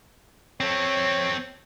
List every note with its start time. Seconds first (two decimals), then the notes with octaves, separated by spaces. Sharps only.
0.60 C4 A4 C#5